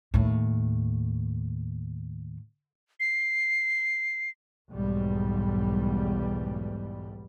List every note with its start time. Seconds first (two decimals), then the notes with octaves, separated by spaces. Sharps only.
0.14 D#2 A2
3.00 C7
4.70 B1 E2 G#2 G3